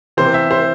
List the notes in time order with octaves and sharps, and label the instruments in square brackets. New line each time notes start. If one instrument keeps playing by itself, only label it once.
[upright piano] C3 E3 C5
E5
C5